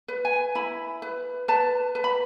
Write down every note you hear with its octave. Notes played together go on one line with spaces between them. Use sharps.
B4
G#5
E4 B5
B4
B4 A5
B4
B5